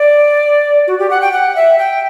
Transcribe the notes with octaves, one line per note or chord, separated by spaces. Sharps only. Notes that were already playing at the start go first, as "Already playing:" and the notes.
Already playing: D5
F#4
G4
F#5
G5
F#5
E5
G5